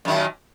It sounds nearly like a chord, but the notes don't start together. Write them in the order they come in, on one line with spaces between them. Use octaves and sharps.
F#2 D#3 A#2